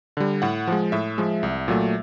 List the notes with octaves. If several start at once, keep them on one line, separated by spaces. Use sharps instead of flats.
D3 G3
A2 F#5
F3 G#3
A2 E5
F3 G#3
C2
A#2 F#3 A3